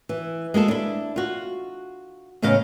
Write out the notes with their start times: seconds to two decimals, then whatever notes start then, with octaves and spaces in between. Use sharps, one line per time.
0.09 E3
0.54 G#3 A#3 G#4 A4
0.68 D4 E4
1.16 F4 F#4
2.42 E2 A2 C#3 D#5 F5